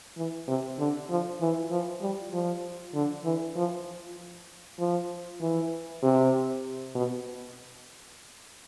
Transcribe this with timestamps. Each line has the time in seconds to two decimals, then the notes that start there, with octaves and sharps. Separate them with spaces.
0.17 E3
0.48 C3
0.79 D3
1.10 F3
1.41 E3
1.71 F3
2.02 G3
2.33 F3
2.94 D3
3.25 E3
3.56 F3
4.79 F3
5.41 E3
6.03 C3
6.95 B2